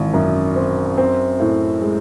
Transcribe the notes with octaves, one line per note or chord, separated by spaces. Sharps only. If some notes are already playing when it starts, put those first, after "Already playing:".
Already playing: G#1 E3
F#2
C4
C4
A2
G#3